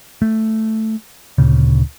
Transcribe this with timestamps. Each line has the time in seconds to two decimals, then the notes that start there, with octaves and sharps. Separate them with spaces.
0.22 A3
1.38 D2 A#2 C#3